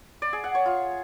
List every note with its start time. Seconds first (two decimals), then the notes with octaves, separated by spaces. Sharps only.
0.22 D5
0.33 G#4
0.44 F#5
0.55 C#5
0.66 F4